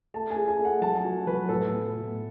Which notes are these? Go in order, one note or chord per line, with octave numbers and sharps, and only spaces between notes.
A3 A5
G#5
G#4
G#5
A3
F#5
F#3 A5
F#4
F#3 B4
A2 A4
B3
A2